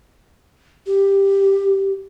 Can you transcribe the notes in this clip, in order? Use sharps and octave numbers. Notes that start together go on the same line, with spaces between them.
G4